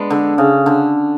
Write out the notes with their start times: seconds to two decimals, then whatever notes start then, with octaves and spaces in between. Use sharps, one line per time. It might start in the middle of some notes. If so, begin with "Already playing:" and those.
Already playing: G#3 B3 D4
0.10 D3
0.38 C#3
0.66 D3